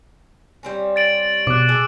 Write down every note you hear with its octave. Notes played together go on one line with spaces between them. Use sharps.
G3 C4 C#4
A6 D7 F#7
B2 D6 F#6
G#4 A4